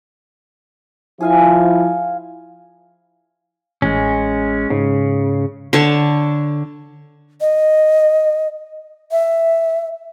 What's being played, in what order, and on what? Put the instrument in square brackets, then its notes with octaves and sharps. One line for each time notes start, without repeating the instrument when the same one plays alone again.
[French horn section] F3 E4 [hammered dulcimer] G#4 F5 G#5
[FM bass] A1 [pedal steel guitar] G#3 C#4
[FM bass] G#2 [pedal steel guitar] C#3
[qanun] D3 C#5 A5
[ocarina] D#5
E5